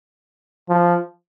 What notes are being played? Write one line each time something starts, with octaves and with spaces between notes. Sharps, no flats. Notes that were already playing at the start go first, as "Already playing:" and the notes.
F3